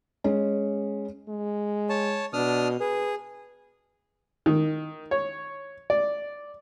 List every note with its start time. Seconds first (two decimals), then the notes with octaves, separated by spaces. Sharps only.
0.24 G#3 C#4
1.29 G#3
1.89 C#5 A5
2.33 B2 D4 D#6 F6
2.80 G#4 B4
4.46 D#3
5.11 C#5
5.90 D5